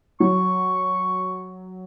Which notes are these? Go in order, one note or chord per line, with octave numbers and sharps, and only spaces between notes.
F#3 C#6